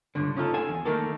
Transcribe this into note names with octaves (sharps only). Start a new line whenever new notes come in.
C#2 G2 D3
C#4 D#4 F4 G#4 A4
A4 F5 G#5
E2
D#3 A3 A#3 A4